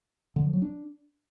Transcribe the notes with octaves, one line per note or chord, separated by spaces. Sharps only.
D3
F3
F#3
D4